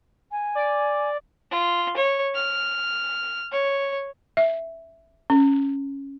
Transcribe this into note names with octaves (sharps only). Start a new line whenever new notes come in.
G#5
D5
F4
C#5
F6
C#5
E5
C#4